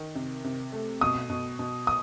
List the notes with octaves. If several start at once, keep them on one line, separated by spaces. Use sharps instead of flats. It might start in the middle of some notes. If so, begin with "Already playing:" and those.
Already playing: D#3
C3
C3
A3
B2 D#6
B2
B2
D#6